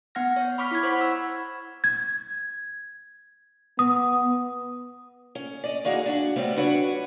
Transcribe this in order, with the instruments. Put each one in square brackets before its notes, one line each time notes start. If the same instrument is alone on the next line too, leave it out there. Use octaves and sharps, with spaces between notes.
[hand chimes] B3 F#5 F6 A#6
C#5
B5 C#6 D6 F6 B6
E4 B5 G#6
C5 F#5 B5 C#6 B6
E6
[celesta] G#6
[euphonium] B3 [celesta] D#6
[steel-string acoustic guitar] C#4
D5 D#5
E3 A#3 D#4 F#4 G#4
D4 F#4
C#3 G3 A3 B3 C4
D4 F#4 B4 C#5